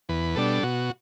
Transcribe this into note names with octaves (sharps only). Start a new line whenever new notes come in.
E2 B4
B2 G3 D4 A4
B2 F#4